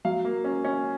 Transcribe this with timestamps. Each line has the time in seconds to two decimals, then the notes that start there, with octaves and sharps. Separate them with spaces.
0.05 F#3 F5
0.25 A#3
0.44 C#4
0.64 C#4